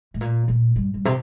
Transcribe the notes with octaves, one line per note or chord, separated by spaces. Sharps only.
A2
A#2
A#2
G2
G2
C3